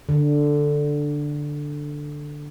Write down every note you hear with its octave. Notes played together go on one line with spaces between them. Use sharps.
D3